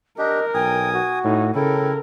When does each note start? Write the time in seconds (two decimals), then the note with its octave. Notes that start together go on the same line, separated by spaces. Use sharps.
0.18 D4 G4 A#4 D#5
0.54 B1 G5 G#5 D#6
0.93 F#4
1.24 A2 D#4
1.55 C#3 E4 A4 A#4 G5